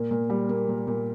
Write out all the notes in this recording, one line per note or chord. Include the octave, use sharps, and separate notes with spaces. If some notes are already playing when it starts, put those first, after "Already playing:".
Already playing: A#2 A#3
A#2
G3
A#3
A#2
A#2